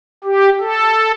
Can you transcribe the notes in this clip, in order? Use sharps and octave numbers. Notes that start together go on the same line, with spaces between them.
G4
A4